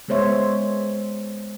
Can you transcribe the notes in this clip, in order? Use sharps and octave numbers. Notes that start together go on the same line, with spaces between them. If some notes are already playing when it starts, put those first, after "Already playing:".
G#3 B3 C5 C#5 E5